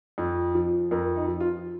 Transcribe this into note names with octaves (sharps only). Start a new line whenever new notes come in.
F2
F3
F2 A#4
D#4
F3
F4